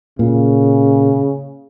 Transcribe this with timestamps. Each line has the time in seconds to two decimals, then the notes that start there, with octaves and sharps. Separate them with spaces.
0.19 A#2 C#3